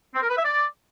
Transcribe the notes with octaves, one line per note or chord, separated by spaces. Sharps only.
C4
A#4
B4
E5
D5